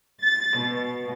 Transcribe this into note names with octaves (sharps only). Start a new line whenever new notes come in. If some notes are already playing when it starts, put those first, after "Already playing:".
A6
B2